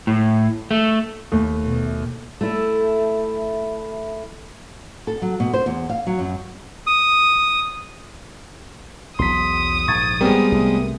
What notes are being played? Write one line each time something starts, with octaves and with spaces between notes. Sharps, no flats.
A2
A3
D#2 A3
B2
A3 E4
A4
F#3
B2
C5
E2
F5
F#3
F#2
D#6
B1 E2 F#3 C6 D#6 B6
A#1 G#2 C#6 G#6 A6
G3 G#3 B3 C4 A#4
C2 A3